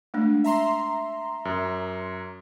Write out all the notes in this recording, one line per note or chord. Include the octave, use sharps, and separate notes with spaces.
G#3 A3 D4
E5 A#5 C6
F#2